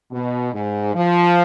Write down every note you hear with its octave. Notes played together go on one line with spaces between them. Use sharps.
B2
G#2
F3